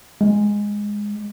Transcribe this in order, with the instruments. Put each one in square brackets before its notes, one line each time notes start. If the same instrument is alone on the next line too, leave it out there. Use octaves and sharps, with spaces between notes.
[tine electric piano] G#3